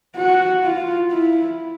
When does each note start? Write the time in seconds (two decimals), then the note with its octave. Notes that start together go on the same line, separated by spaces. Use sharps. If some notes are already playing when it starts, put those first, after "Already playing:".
0.16 F#4
0.64 F4
1.11 E4